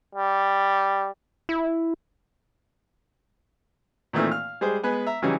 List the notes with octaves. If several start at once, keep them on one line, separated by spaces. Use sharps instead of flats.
G3
E4
A#2 D#3 E3 A3 A#3 C4
F5 F6
G3 G#3 G#4 C5
G#3 B3 B4 G#5
E5 A#5
C#3 E3 F#3 G3 C#4 D#4